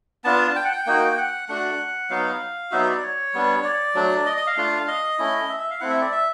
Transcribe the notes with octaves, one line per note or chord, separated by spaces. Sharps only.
B3 D4 F4 A5
G5
F#5
G5
A#3 D#4 F#4
F#5
A3 D4 F#4 F#5
F#3 B3 D#4 F#4 F5
F#3 B3 D#4 F#4 E5
D5
C#5
G3 B3 D4
D5
F#3 A3 D4
D#5
D#5
F5
A3 D4 F4
D#5
A3 C#4 E4
E5
E5
F5
A3 C4 E4 F#5
E5
D5
E5